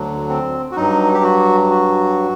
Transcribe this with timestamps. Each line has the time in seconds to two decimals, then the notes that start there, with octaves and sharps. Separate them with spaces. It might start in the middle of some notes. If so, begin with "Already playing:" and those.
Already playing: D2 D3 F#3
0.29 C4
0.71 F#4
0.76 G2 F#3 D#4
1.14 G4
1.24 F#4
1.71 F#4